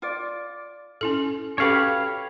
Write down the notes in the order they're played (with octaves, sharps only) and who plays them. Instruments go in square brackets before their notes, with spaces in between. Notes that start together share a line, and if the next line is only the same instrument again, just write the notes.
[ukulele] F4 D5
[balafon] C#4 E4 A4
[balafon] C#4 A4 [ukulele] F#4 G4 B4 [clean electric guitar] C#5 F5